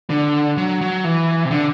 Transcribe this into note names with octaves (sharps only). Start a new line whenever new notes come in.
D3
F#3
F#3
E3
C3
D3